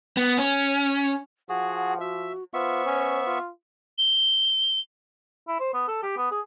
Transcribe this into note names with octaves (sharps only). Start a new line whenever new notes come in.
B3
C#4
F3 F#4 G#4 F#5
F#4 E5
B3 F4 C5 E5 C#6
C#4
F4
G7
E4
C5
B3
A4
G4
B3
G#4